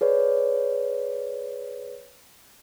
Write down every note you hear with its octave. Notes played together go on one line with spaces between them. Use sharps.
G#4 B4 C#5 D5